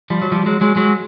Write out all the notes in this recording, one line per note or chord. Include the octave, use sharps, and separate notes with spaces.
F3 G3
F#3
F3 G3
F#3 G#3
F#3 G#3
F#3 G#3